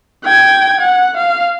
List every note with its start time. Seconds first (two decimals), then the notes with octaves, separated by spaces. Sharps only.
0.24 G5 G#6
0.81 F#5
1.18 F5